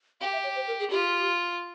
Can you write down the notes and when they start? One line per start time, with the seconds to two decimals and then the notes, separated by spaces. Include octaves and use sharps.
0.20 G4 F5
0.32 E5
0.43 C#5
0.55 C5
0.67 A#4
0.79 G#4
0.90 F4 G4